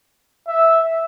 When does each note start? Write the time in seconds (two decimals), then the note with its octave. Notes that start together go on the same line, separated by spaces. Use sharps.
0.48 E5